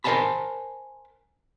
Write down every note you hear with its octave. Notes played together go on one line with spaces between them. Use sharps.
A#4 C5 D#5 G#5 A5 B5